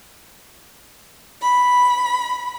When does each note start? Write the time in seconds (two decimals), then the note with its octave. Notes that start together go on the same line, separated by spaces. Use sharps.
1.42 B5